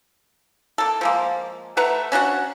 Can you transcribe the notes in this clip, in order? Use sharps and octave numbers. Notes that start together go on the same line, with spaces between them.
A#3 A4
F3 G#3 A#3
A3 B4 F#5 A#5
C#4 D4 F#4 F#5